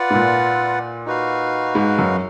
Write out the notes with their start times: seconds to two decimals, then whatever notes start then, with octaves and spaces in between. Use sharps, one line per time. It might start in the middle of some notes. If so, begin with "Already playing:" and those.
Already playing: F4 B4 D5 F#5
0.10 G#2
0.14 A#2
1.06 D#4 F#4 B4 F5
1.75 G#2
1.99 F#2